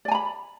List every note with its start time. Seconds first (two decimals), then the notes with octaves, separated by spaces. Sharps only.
0.05 D5
0.08 G#5
0.11 A#5
0.15 B5